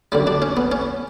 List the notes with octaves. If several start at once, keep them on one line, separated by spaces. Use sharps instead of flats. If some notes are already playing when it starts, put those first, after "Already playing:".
F#2 D3 G3
D4
C#4
B3
C#4